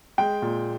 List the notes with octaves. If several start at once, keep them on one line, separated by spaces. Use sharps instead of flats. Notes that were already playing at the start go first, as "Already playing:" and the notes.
G#3 G5
A#2